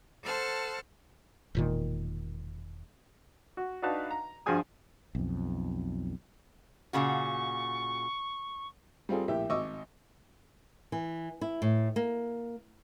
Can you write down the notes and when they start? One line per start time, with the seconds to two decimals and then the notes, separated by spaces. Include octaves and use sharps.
0.22 A4 C5 F#5 A5 F6
1.55 E1 A#2 D#3
3.57 F#4
3.82 D4 D#4 F#4 B4 F5 A5
4.11 A#5
4.46 G2 F3 F#4 G#4 G#5 D#6
5.15 B1 F2
6.93 A#2 C#3 F#4 C#6
9.09 G3 C4 F4 G#4 A4
9.28 A#1 A2 G4 E5
9.50 G#1 D#5 C#6 D6 E6
10.92 E3
11.41 E4
11.62 A2
11.96 A#3